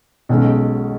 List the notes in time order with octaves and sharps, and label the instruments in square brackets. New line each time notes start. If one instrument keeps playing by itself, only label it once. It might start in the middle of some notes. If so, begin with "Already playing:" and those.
[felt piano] B1 B2 G#3 C#4